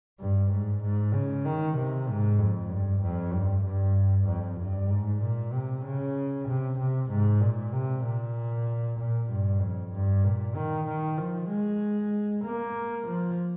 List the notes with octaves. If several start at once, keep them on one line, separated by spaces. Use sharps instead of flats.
G2
G#2
G#2
C#3
D#3
C3
G#2
F2
G2
F2
G2
G2
F2
G2
G#2
A#2
C3
C#3
C3
C3
G#2
A#2
C3
A#2
A#2
G2
F2
G2
A#2
D#3
D#3
F3
G#3
A#3
F3